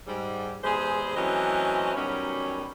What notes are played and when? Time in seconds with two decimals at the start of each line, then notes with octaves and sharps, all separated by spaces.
0.08 G#2 G3
0.64 E2 G#3 G4 G#4 C5
1.16 E3 F#3 A3 C4 C#4 D#5
1.96 B2 D#3 F#3 G3 C#4